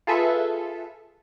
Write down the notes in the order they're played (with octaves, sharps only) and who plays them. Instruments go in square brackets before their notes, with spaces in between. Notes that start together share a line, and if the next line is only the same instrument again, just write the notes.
[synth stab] F4 G#4 A4 B4 E5